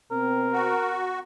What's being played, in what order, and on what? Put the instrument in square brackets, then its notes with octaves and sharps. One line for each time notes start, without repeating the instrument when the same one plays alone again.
[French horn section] B2 C4 [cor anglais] A#4
[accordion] F#4